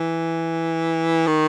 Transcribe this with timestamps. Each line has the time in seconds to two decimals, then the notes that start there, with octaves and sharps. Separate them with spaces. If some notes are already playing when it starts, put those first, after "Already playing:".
Already playing: E3
1.27 D#3